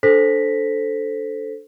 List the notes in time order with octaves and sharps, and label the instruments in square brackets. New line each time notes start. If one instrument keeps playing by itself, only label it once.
[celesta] D4 A4 C5 A#6 B6